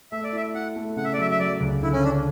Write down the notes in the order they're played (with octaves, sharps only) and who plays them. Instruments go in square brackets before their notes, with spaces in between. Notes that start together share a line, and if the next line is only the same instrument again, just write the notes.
[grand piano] A3 [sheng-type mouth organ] E5
[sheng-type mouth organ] D5
[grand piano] E4 [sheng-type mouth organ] E5
[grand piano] E4 [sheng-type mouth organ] F#5
[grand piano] A3
[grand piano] C#3 [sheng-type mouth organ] F#5
[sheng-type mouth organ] E5
D5
[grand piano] F#3 [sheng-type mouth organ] E5
[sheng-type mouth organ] E5
[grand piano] F#3 [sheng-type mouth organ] D5
[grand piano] C#2
[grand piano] D3 [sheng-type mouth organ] E4
[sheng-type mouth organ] C#4
[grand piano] D3 [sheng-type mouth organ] D4